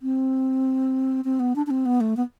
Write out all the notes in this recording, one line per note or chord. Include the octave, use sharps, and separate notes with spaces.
C4
C4
B3
D4
D4
C4
B3
A3
B3